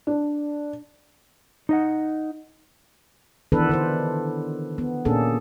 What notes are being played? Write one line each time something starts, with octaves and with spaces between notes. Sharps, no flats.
D4
D#4 D#5 F#5
D#3 E3 B3 D4 A4 B4
D3 B4 C5
B3
A#2 A#3 C#4 D4 G#4 A4